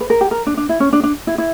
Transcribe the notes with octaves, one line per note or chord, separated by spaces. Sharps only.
B4
A#4
G4
A#4
D4
D4
E4
C#4
D4
D4
E4
E4